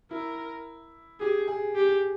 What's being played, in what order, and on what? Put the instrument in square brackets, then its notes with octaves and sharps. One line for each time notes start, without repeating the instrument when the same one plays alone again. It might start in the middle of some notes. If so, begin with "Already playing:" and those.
[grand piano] E4 [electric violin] A#4
[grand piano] G4 [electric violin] G#4
[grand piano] G#4
[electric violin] G4